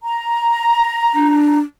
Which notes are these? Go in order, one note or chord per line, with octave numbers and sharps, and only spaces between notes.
A#5
D4